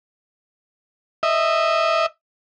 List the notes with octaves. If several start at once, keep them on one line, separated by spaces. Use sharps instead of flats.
D#5 E5